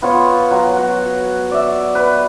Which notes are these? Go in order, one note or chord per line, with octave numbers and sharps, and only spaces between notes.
B3 F4 C#5
F#3
F#4
D5 E5
B4